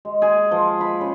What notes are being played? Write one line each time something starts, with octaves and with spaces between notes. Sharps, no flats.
G#3
G#4
F3
B5
C#3